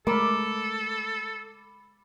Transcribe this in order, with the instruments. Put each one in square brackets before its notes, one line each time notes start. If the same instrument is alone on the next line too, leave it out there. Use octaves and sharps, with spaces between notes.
[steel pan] G#3 A#4 [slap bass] A3 [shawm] A4 [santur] B5 D6